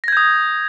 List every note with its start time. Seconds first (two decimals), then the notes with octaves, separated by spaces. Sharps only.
0.04 A#6
0.08 G#6
0.12 G6
0.17 D#6